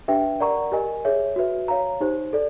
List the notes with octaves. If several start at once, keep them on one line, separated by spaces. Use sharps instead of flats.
D4 G4 B4 E5 G5
A#4 D5 F#5 A#5 C#6
G4 A#4 D#5 G#5
G#4 C#5 E5
F#4 B4 E5
C#5 F5 A#5
D#4 G4 C5
A4 D5